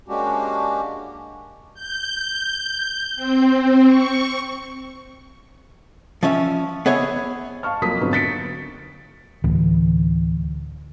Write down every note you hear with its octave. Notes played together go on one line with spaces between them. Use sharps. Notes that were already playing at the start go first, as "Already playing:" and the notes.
G#3 A#3 C#4 D4 F#4 G4
G6
C4
C#6
F3 C#4 E5
B3 G#4 C#5 E5
F5 A5 C#6 F6
F2 F#3 A#3 D#6 B6
G#2 D3 F#3 B3 C4
A6 B6 C#7 D7
D2 A2 D3 E3